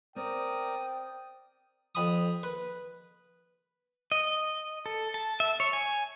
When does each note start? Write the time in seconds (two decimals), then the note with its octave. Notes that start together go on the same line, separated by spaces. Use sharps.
0.16 C4 A#4 D5 G5 D#6
1.95 F2 B5 D#6
2.43 B4
4.12 D#5
4.86 A4
5.14 A5
5.40 E5
5.60 C#5
5.73 G#5